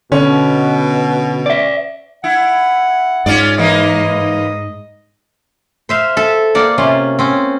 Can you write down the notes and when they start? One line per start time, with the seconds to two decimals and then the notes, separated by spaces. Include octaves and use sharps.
0.12 B2 D3 C#4
1.46 D5 E5
2.24 E4 F#5
3.26 G#2 C#4 F4 D5
3.58 E3 A#3 D#4 D#5
5.89 C5 E5 F5
6.17 A4 E5
6.55 A#3 D5 F#5
6.78 C3 C#4 F4
7.19 C4 C#4